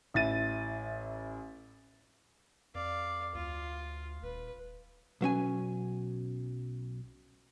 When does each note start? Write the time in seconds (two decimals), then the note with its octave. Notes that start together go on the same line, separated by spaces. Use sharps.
0.14 A1 E4 A6 D#7
2.75 F2 D5 F5
3.35 D2 F4
4.23 D#1 B4
5.21 B1 F#3 C#4 G#5